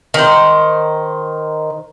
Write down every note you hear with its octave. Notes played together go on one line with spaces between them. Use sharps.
D#3 C5